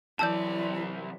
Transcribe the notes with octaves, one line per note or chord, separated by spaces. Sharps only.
C2 E3 F#3 E4 D5 A5 E6 G6